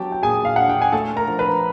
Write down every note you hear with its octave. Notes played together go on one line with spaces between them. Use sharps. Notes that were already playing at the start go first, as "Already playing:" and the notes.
Already playing: F#3 B3 G4 G5 A5
G5
A#2 G#4 G#5
F5
D4 F#5
G5
G#5
A3 A4 A5
A#4 A#5
F3
B4 B5